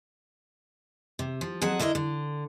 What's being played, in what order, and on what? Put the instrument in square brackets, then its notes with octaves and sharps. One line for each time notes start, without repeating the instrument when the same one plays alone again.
[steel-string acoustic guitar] C3
F3
F2 F#3 C4 G#4 F#5
D3 E4 A#4 C5 D#5
D3